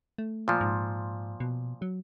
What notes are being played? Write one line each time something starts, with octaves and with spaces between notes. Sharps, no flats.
A3
A#2 F3
G#2
B2
F#3